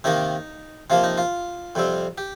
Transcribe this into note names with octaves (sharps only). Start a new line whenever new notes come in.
C3 D#3 A#3 D#4
C3 F3 A#3 F4
D#4
F4
F2 C3 G3 C4
G4